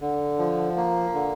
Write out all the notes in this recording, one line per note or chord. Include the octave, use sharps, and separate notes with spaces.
D3
F3
A#3
D3